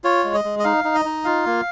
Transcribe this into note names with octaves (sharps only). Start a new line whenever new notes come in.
F4 C#5
G#3
D#5
G#3
D#5
D#4 F5
D#4
D#5
D#4
F4 F5
A#3